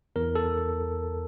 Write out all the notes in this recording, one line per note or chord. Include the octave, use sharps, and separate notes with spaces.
E2 A#4
A4